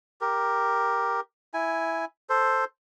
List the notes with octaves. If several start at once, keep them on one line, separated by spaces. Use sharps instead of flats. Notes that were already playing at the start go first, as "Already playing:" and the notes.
G4 A#4
E4 G#5
A4 C5